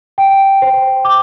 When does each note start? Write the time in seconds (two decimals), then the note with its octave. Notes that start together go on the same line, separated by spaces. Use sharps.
0.18 G5
0.62 C5
1.05 D6